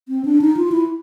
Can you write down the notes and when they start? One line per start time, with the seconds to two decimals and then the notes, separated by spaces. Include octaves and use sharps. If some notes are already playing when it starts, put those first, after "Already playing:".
0.08 C4
0.25 D4
0.41 D#4
0.57 F4
0.72 E4